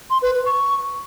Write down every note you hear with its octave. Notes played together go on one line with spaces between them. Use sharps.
C6
B4
B4
C#6